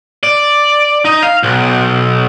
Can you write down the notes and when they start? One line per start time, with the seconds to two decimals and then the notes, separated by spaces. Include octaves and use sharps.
0.23 D5
1.05 D#4
1.22 F5
1.43 B1